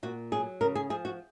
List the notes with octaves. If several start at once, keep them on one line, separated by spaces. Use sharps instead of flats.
A#2 F#4
F#3 G#4
C#3 A#4
G#4
F3 G#4
F#4